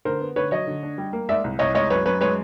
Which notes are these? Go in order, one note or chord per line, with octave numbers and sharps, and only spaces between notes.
D3 A#4 C5
B3
D3 B4 C#5
F#3 C#5 D#5
D3
D4
G3
A#3
G#3 D5 E5
C2
C2 C#5 D#5
G#3 C#5 D#5
F#2 B4 C#5
F#2 B4 C#5
G#3 B4 C#5